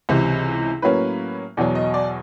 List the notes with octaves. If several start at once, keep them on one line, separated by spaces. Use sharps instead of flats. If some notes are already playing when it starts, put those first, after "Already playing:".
C#2 C3 E3
A2 F#3 A#3 C#4 B4
E2 B2 F#3 D5
D#5
D5